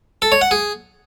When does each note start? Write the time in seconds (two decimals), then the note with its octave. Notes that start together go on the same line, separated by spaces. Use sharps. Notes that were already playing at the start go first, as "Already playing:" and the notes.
0.22 A4
0.32 C#5
0.41 F#5
0.51 G#4